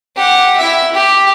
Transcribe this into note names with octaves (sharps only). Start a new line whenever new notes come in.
G4 F#5
E4 E5
G4